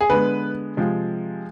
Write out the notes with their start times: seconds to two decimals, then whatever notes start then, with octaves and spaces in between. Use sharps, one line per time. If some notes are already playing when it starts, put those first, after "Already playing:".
0.01 G#4
0.10 D3 G#3 B3 B4
0.77 C3 F3 G#3